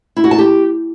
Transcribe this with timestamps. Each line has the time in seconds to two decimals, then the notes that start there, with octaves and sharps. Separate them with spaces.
0.17 E4
0.24 F#4
0.31 A5
0.38 G4